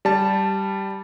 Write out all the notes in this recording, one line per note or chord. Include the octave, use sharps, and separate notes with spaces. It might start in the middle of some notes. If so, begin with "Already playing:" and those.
G3 A5